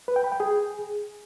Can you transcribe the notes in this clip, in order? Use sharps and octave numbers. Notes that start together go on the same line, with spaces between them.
B4
G5
B5
G5
G#4